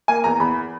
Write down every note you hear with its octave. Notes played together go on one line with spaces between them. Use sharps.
A#3 G#5
E2 A#5
E2 B5